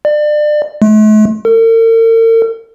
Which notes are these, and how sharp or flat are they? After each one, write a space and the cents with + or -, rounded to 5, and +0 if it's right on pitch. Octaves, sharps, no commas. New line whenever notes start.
D5 +30
A3 -45
A#4 -45